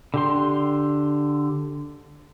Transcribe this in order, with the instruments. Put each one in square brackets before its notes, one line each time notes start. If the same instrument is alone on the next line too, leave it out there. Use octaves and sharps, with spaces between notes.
[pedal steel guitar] D3 G4 C6